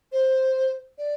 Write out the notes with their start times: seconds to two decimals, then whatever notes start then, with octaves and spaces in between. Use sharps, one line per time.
0.12 C5
0.98 D5